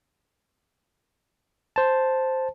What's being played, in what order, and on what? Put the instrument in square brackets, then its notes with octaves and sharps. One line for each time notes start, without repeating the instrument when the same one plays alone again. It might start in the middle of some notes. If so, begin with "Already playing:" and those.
[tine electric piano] C5 A5